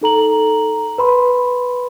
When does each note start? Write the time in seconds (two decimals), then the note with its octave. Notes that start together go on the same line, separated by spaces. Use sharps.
0.01 D#4 A4 A#5 F#7
0.98 B4 B5 C6